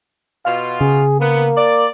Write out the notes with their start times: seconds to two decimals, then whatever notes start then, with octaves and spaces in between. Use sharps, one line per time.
0.45 B2 F4 F5
0.81 C#3 G#4
1.20 A#3 B3
1.56 D5